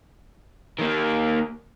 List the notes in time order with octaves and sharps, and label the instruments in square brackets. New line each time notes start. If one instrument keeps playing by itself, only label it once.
[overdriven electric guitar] D#3 A#3